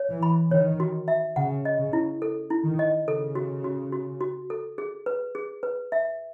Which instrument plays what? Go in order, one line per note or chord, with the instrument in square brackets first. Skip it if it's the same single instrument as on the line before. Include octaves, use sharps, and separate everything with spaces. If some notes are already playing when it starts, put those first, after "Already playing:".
Already playing: [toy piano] C#5
[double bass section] E3
[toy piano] B5
[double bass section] D#3 [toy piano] C#5
[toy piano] F#4
E5
[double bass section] C#3 [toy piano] F#5
[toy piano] D#5
[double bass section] C#3
[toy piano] E4
A4
E4
[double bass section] D#3
[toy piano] D#5
[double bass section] C#3 [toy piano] A4
[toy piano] F#4
F#4
F#4
F#4
A4
G#4
B4
G#4
B4
E5